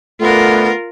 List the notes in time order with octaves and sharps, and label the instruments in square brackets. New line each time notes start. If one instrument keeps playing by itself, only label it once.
[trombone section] D3 B3 [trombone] A3 [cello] F4 A#4